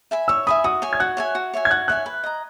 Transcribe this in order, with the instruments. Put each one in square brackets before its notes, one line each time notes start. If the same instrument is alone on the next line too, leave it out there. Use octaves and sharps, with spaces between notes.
[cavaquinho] E5 G#5 B5
[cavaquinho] C#5 [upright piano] E6
[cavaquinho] E5 G#5 B5 [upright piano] D#6
[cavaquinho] F#4 [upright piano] D#6
[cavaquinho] C#5 E5 G#5
[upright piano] G#6
[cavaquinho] F#4 [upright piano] F#6
[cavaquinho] C#5 E5 G#5
F#4
C#5 E5 G#5
[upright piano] G#6
[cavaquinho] F#4 [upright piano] F#6
[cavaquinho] C#5 E5 G#5 [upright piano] F#6
[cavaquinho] B4
D#5 A#5